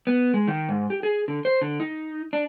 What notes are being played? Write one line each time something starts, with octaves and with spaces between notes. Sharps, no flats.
B3
G#3
D#3
G#2
G4
G#4
D3
C5
D3
D#4
D4